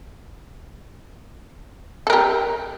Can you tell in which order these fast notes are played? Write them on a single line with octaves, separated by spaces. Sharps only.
A4 A#4 G4